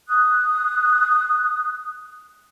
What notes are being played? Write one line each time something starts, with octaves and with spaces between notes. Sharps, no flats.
D#6 F#6